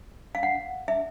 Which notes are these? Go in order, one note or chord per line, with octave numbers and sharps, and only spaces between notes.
F5
F#5
E5